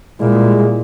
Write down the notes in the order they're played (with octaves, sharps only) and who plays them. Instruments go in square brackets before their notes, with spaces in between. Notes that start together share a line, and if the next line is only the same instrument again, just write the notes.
[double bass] A#2 [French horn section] G3 G#3 E4